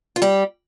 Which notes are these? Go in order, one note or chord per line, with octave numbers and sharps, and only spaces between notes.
F4
G3 G4